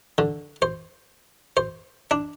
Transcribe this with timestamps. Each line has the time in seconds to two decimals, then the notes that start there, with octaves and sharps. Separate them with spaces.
0.18 D3
0.62 C5
1.57 C5
2.11 D4